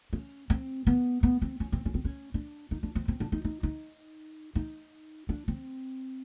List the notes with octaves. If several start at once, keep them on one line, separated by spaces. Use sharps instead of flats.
C#4
C4
B3
B3
C4
C#4
C4
C#4
C4
C#4
D4
D#4
D4
C4
C4
D4
D#4
D#4
D#4
D#4
D4
C4